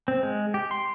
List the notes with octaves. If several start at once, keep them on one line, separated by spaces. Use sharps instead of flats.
C4
G#3
G4
C6